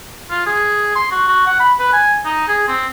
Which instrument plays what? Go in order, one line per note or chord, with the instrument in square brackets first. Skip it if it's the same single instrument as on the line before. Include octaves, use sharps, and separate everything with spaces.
[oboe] F4
G#4
C6
F#4
F#4
F#5
B5
B4
G#5
D#4
G#4
C4